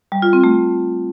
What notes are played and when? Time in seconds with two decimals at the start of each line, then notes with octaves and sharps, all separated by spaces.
0.12 G3
0.22 F4
0.33 C4
0.44 A3